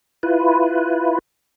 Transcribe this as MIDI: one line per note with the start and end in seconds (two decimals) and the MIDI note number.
0.23 1.19 64
0.23 1.19 65
0.23 1.19 71